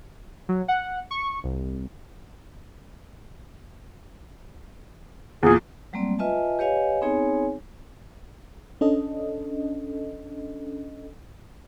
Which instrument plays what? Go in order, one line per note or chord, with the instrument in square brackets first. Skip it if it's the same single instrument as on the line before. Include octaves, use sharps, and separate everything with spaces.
[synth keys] F#3
F#5
C#6
C2
[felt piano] E2 A#2 [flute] G#4
[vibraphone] F#3 G3 A3 A#3 C4 D5
F4 B4 D#5 E5 G#5 A5
G4 B4 C#5 D#5 F5 G#5
B3 C4 D#4 G#4 C#5 G#5
[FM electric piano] C#4 D4 A4 D#5